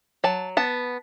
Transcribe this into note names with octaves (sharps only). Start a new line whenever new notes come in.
F#3 A5
B3 A5